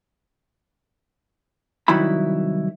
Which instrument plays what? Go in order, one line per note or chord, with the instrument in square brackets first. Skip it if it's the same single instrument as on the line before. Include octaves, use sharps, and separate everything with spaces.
[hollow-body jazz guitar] C2 D#3 F#3 E4 B5